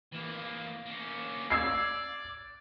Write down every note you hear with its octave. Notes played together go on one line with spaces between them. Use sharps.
E3 A#3
A#3 C#4
D5 E6 G#6 C7